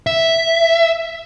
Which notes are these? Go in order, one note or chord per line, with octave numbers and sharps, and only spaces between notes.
E5